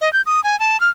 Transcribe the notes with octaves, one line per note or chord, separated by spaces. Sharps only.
D#5
G6
D#6
G#5
A5
F6